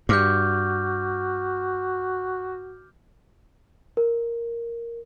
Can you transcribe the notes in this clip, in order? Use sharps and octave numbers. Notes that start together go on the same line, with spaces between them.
G2 F#4 D6 F6 G6
A#4